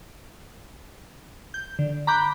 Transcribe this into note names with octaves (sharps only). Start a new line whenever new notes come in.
G6
D3
A#5 B5 D6 F#6 G6